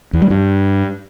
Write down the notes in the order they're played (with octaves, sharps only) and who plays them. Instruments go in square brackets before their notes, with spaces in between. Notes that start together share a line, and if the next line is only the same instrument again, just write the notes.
[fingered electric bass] E2
G3
G2